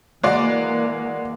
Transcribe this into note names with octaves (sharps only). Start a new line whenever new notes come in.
E3 G#3 A#3 F#4 D5